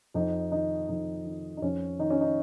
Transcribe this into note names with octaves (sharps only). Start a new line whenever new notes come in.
F2 D#4
D#3 D#4
F2 D#4
D#3
D#4
F2 C#4
D#3 D#4
C#4
D#4